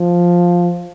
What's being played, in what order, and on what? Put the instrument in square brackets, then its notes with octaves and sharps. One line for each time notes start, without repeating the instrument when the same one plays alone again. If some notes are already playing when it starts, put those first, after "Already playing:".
Already playing: [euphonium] F3